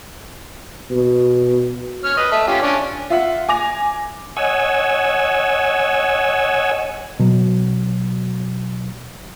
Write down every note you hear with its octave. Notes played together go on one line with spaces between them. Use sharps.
B2
C#5 F6
B4 D#5
A4 E5
C#4 F4 G4
C#4 D4 D5
F4 E5 F#5
G#5 D6 A#6 F7
C#5 D#5 F#5 G#5 E6
B2 F#3